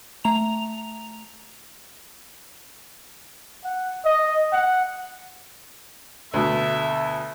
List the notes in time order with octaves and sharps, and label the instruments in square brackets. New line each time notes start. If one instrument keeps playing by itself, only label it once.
[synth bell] A3 A#5 F7
[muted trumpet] F#5
D#5
F#5
[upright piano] D2 B2 [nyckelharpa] E5